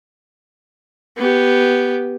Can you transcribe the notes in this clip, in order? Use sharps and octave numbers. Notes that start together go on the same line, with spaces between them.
B3 G4